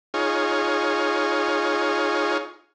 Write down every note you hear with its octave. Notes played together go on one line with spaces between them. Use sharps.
D#4 F4 G#4 C#5